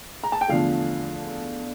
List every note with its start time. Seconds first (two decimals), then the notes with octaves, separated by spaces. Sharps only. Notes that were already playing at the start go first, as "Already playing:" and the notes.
0.23 A#5
0.32 A5
0.41 G5
0.48 E2 D3 F3 A3 F5